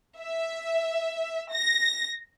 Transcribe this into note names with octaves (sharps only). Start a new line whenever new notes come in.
E5
A#6